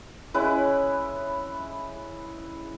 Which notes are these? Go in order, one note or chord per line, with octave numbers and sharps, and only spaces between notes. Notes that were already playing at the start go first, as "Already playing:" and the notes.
G#3 C#4 E4 B4